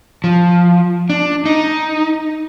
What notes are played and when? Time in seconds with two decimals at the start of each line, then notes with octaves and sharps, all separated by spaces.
0.24 F3
1.10 D4
1.46 D#4